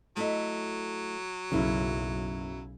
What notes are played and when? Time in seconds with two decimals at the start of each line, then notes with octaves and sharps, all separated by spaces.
0.17 F#3 A3 E4 D#5
1.52 B1 F#2 C#3 A#3 E4 A#4